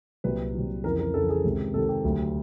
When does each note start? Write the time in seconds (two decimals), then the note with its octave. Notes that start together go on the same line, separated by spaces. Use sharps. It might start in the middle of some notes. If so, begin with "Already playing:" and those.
0.24 C2 A#2 F#3 B4
0.54 C2 A#2 F#3
0.84 F2 C#3 E3 A#4
0.99 A#4
1.14 F2 C#3 E3 A4
1.29 G#4
1.44 C#2 C3 D#3
1.74 C#2 C3 D#3 A4
1.89 G4
2.04 D2 D3 F#3